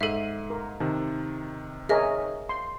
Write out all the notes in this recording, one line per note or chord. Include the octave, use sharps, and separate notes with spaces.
G#2 A4 E5 C7 D#7
A#4
C3 D#3 A5
G#4 A#4 C#5 D#5 E5
C6